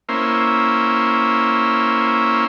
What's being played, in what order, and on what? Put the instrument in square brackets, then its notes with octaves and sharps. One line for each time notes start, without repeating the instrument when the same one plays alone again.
[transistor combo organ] A#3 C#4 E4 C5